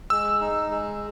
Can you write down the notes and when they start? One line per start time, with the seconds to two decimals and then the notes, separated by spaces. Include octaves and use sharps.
0.10 G#3 E6
0.41 D#4
0.71 G#3